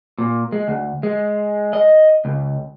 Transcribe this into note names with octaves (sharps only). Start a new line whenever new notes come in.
A#2
G#3
D2
G#3
D#5
C#2